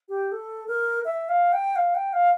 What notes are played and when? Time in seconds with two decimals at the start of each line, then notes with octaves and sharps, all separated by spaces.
0.09 G4
0.32 A4
0.68 A#4
1.05 E5
1.29 F5
1.53 G5
1.76 F5
1.95 G5
2.13 F5